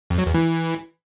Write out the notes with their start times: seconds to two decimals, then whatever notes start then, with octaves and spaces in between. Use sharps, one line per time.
0.10 F2
0.18 F#3
0.26 E2
0.34 E3